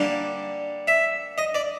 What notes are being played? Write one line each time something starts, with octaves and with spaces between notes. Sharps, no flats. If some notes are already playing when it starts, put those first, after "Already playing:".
Already playing: D3 G3 A#3 D4
E5
D#5
D5